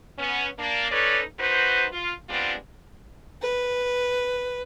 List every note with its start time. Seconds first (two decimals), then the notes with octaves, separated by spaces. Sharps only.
0.19 B3 C#4
0.59 A#3 D4
0.92 C#4 D#4 A4 B4 C#5 D5
1.39 F#2 D#4 F#4 B4 C5
1.92 F4
2.29 G3 G#3 B3 C4 D4 F4
3.42 B4